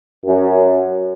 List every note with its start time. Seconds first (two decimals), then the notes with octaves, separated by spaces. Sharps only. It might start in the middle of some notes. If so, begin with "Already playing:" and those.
0.25 F#2